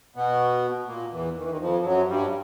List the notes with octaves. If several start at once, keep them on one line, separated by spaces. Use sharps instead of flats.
B2 B3
A#2 A#3
E2 E3
D#3
E3
D#2 D#3
F2 F3
F3
F#2 F#3
G2 G3